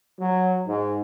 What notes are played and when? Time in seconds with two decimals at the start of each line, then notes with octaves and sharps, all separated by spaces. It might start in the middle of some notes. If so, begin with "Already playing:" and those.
0.20 F#3
0.67 G#2